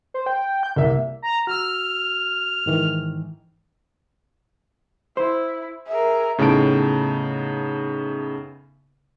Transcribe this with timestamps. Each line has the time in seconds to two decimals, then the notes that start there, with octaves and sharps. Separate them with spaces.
0.14 C5
0.26 G5
0.63 G6
0.76 C2 A#3 E5
1.22 A#5
1.47 F#4 E6 F6
2.66 G#2 D#3 E3
5.17 E4 C5
5.87 G#4 A#4 E5
6.38 A2 C#3 B3 D#4 A5 D7